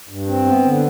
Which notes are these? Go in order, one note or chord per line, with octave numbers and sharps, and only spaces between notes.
G2
C4
B3
D3